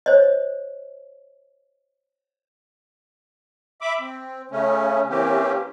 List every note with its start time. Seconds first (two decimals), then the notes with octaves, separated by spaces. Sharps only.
0.06 C5 C#5 D#5
3.81 E5 B5 D6
4.00 C4
4.51 C#3 A3 C#4
5.10 E3 A#3 C4 C#4 G4